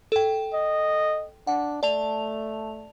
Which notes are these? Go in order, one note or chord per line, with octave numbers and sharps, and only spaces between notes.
A4 G5
D#5
D4 F#5
A3 D5 A5 F7